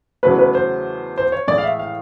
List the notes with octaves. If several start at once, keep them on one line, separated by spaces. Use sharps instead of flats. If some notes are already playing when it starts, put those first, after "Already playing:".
E2 C#3 F#3 A3 B4
B4
C5
C5
C#5
A2 E3 G#3 D5
F5
E5
F5